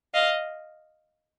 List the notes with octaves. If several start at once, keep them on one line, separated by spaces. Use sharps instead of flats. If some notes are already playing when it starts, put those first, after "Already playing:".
D#5 F5